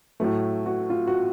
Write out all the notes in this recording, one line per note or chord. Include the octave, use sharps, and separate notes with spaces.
A2 F#3 A3
F#4
F4
F#4